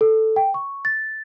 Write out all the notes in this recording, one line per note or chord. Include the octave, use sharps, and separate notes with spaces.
A4
G5
C#6
A6